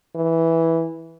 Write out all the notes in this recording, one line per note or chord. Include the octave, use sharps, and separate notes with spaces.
E3